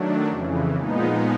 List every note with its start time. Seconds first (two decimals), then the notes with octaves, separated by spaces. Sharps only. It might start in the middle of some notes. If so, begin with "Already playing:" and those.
Already playing: D#3 F#3 A3 D4
0.28 F2 C#3 E3
0.75 A#2 F3 G#3 B3 D#4